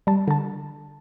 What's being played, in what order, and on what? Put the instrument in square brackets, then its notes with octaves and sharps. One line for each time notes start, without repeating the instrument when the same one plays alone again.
[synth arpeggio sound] G3 A5
D3 A5